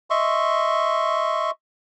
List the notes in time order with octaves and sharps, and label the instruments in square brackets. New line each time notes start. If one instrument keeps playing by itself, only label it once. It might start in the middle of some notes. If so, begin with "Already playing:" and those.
[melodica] D#5 E5 C6 C#6